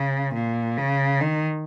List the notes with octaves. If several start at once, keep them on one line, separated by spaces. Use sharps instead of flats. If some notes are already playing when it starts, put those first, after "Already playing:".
Already playing: C#3
A#2
C#3
D#3